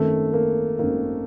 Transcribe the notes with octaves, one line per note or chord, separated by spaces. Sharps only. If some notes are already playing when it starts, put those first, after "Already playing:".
Already playing: G#1 F#2 D#3 A3
A#3
G#1 F#2 D#3 A#3